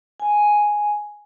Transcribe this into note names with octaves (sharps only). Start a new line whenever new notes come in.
G#5